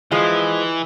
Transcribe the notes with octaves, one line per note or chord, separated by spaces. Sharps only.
E3 F3 G#3